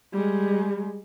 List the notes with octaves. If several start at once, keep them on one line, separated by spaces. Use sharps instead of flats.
G3 G#3